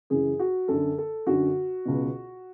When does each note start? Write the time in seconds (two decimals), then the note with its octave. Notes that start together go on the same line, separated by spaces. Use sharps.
0.10 F#2 C#3 E3 G#4
0.39 F#4
0.68 F#2 D3 A4
0.98 A4
1.26 F#2 D3 F#4
1.85 C#2 B2